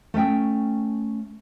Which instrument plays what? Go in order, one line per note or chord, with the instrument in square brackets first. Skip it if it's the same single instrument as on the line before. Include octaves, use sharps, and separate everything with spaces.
[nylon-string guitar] A3 C#4 E5 G5